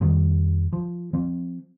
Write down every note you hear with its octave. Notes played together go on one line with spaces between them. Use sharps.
F2 D#3 G3
F3
F3 C4